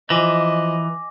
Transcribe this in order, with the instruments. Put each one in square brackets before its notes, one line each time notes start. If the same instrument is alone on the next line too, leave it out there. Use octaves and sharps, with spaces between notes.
[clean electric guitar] E3 [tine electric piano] F3 C6 [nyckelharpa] D#5 [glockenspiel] G#5 D6 A#6